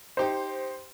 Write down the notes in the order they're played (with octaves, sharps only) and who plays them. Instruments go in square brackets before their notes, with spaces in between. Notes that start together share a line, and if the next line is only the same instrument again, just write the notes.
[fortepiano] D#4 G4 [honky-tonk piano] C5